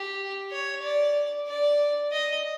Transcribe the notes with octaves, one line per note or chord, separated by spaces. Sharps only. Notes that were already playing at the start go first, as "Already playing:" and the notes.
Already playing: G4
C#5
D5
D5
D#5